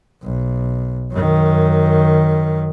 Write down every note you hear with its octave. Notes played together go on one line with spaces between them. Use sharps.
B1
F#2 D#3